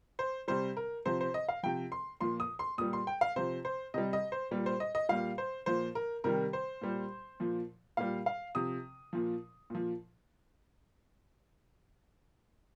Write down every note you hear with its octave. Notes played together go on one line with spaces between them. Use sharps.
C5
C3 G3 C5
A#4
C3 F3 C5
C5
D#5
F5
C3 F3 G5
C6
A#2 F3 C6
D#6
C6
A#2 G3 D#6
C6
G5
F5
C3 F3 C5
C5
C3 G3 D#5
D#5
C5
A#2 G3
C5
D#5
D#5
A#2 G3 F5
C5
A#2 F3 C5
A#4
C3 D#3 G3 A#4
C5
A#2 G3
A#2 F3
A#2 G3 F5
F5
C3 F3 D#6
A#2 F3
A#2 F3